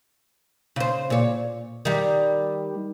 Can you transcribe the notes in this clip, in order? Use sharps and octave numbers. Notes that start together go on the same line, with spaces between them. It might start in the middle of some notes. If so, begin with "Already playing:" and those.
C#3 C5
A#2 C#5
D#3 G3